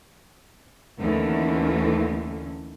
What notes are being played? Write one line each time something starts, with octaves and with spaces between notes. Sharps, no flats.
D#2 D3 E3 A3 C#4